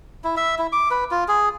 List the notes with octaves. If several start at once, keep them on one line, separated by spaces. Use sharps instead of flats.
E4
E5
E4
D6
B4
F4
G#4